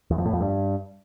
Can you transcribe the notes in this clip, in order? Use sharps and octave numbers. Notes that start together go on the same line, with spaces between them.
E2
F2
A2
F2
G2